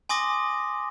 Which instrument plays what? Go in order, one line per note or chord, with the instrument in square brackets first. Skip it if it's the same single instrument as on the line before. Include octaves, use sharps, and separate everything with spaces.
[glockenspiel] G#5 C6 D6 D#6 A#6